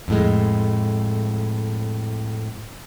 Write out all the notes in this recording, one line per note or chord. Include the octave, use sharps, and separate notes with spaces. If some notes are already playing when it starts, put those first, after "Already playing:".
F2 A2 G#3